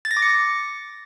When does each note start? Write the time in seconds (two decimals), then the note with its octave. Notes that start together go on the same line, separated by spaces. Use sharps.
0.05 A6
0.11 A#6
0.17 D6
0.22 C#7